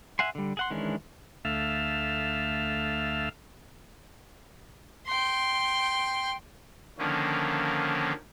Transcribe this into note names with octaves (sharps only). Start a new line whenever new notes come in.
E5 F#5 G#5 C6
D3 G3
G#4 F#5 C6
D#3 E3 G#3 C#4 D4
D2 A3 E5 F5
G5 C6
D3 D#3 F3 A#3 C#4